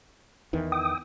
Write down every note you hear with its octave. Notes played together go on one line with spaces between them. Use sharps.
E2 D#3 E3
G5 D#6